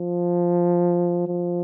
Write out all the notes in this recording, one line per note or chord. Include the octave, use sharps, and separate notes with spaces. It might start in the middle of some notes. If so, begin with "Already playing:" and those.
Already playing: F3
F3